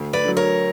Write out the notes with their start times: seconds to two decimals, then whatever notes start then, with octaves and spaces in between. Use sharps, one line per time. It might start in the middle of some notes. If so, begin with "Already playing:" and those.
Already playing: D2
0.13 B4 D5
0.24 D3 F#3
0.37 A#4 C#5